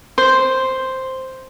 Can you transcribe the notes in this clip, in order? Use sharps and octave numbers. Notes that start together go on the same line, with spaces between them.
C5